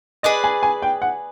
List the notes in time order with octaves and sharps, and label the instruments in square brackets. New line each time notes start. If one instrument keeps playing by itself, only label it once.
[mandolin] G#4 B4 D5 [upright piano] D#5
[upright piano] G#5
G#5
G5
F#5